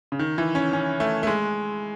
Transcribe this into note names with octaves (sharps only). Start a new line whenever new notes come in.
C#3
D#3
E3
C#4
C#4
A3
A3
G#3